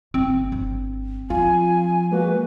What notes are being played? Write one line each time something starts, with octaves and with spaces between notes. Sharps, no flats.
F#1 C4
G1
F3 F4 G#5
G#3 A#3 F#4 B4